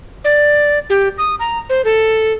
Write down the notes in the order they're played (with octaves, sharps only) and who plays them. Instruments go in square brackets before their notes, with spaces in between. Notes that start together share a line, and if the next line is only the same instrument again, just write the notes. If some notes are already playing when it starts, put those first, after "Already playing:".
[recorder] D5
G4
D#6
A#5
C5
A4